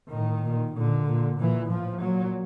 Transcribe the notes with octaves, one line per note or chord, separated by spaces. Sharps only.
A2 D#3
A#2
A#2 D3
A#2
A#2 E3
A2 F3
A#2 F#3